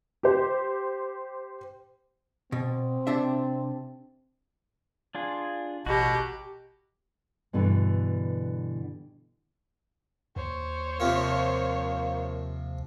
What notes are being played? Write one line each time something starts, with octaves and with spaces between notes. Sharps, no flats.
G4 C5
B2 C4
C3 D4 E5
D4 F4 G#4
A1 B2 F#4 G4 A#5
G2 B2 D3 E3
D#2 C5 C#5
C3 F3 A#3